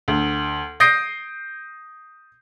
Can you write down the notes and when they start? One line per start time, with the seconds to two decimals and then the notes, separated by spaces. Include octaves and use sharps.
0.08 D2
0.80 D#6 G6 A#6 C7 D7